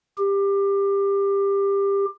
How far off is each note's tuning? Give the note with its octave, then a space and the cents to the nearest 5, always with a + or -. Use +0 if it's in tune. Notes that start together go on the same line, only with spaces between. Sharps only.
G4 +20